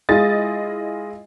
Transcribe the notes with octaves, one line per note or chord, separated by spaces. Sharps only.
G#3 E4 F4 D#5 A6